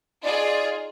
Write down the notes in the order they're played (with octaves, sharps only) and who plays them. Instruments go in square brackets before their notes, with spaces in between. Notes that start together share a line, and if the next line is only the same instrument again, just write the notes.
[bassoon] D#4 [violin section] F4 G#4 [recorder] D5